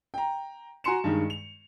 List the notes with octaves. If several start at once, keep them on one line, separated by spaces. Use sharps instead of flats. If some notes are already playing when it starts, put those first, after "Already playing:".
G5 A#5
F#4 G#5 A#5 C6 C#7 E7
G2 D#3 G#3
F7